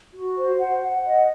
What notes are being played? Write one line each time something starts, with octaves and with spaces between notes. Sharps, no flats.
F#4
C5
F#5
F#5
D#5